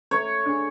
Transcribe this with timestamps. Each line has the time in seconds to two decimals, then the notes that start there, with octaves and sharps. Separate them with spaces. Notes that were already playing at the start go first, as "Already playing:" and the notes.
0.11 A3 C#5
0.46 D4 G#4